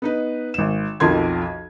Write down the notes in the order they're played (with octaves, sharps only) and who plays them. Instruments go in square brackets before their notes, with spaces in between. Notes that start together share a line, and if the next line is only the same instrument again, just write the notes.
[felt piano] B3 D#4 B4
G#1 E7
B1 F2 F3 A#4 C6 G#6